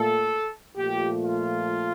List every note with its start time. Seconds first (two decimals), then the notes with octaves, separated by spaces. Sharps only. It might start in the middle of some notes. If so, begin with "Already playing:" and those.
Already playing: A#2 A3 A4
0.76 A#2 F3 A3 G4
1.22 F4